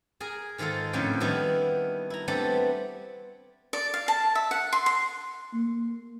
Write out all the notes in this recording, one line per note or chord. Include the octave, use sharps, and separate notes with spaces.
G#4 A#4 G#5
G#2 D#3 G#3 F4 A4
F2 A2 D3 F3 C#4 G5
D#3 G3 B3 D4 E4 F#4
E4 A#5
G3 A3 B3 C4 D4
D5
F5
A5
E5
F#5
C6
C6
A#3